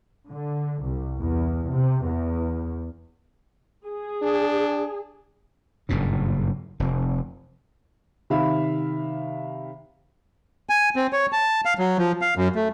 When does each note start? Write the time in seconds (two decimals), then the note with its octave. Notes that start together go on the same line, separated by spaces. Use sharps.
0.28 D3
0.82 C2
1.19 E2
1.70 C3
2.04 E2
3.87 G#4
4.22 D4
5.89 F#1 G2 A#2 C#3
6.80 F1 C3
8.30 C3 D#3 E5 F5 B5
10.69 G#5
10.96 C4
11.13 C#5
11.33 A5
11.65 F5
11.78 F#3
11.98 F3
12.22 F5
12.37 F#2
12.55 A3